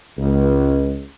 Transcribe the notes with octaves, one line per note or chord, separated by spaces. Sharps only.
C#2